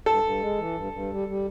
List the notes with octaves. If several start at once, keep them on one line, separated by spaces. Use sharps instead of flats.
G2 A4
G2
G#3
E3
G2
G2
G3
G3